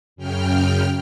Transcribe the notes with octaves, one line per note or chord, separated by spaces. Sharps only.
F#2 C#3 G5 F6